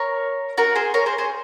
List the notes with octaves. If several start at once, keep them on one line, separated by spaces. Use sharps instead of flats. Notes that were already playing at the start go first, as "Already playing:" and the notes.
Already playing: A#4 C#5
F#4 A#4
G#4 C5
A#4 C#5
G#4 C5
G#4 C5